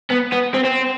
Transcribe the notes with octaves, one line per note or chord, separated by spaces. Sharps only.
B3
B3
C4
C4